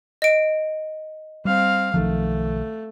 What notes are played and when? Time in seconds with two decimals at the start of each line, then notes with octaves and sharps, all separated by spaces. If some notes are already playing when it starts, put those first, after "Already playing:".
0.22 D#5 D7
1.45 G3 C4 F5
1.94 B1 D#3 F3 A3